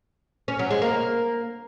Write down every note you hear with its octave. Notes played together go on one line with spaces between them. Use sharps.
C#4
F#3
G#3
A#3